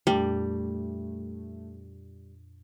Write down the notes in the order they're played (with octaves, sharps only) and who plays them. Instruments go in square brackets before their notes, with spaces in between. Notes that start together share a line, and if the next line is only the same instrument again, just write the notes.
[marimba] F2 A#2 D4 [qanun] G3 [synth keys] A3